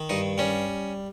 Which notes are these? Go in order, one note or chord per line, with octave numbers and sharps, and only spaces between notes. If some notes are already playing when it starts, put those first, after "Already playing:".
Already playing: D#3
G2 D#4
G3 C#4